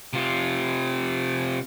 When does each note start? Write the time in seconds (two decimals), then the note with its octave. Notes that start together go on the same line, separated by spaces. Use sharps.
0.13 C3 F4